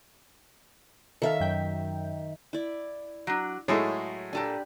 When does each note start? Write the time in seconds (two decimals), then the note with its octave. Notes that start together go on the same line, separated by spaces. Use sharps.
1.22 D#3 A4 E5 F5
1.40 F#2 G5
2.53 E4 D5
3.27 F#3 D4
3.68 A2 F#3 G#3 A3 G#4 C#5 A5
4.33 A#2 D4 G4 A4 B4 G#5